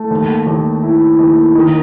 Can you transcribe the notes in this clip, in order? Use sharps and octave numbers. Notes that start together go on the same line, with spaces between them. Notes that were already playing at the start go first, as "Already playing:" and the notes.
Already playing: A3
D#2
D#2
E4
D#2
D#3